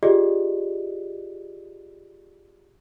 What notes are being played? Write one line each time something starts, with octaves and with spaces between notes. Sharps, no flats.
F4 G4 G#4 D5 D#5